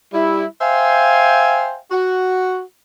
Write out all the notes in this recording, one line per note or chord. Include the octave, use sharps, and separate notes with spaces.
G3 E4
C5 E5 F5 G5 G#5
F#4